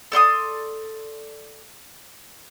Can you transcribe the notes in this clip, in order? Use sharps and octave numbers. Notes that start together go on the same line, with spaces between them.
A4 D5 C6 D#6